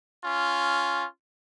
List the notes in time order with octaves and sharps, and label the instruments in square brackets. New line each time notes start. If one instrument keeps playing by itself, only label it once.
[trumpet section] C#4 F4